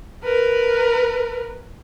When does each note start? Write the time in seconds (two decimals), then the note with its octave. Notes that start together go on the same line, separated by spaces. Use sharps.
0.24 A#4 B4